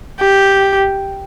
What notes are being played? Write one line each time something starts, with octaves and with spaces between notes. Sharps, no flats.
G4